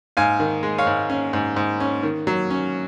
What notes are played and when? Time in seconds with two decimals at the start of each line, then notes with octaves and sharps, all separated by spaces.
0.17 G#2 F5 G#5
0.40 D#3
0.63 G#3
0.78 C#5 F5
0.87 G#2
1.10 C#4
1.33 G#2
1.56 G#2
1.80 C#4
2.03 D#3
2.27 F#3
2.50 C#4